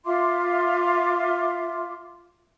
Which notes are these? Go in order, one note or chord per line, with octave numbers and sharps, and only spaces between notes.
F4 E5 C6 D6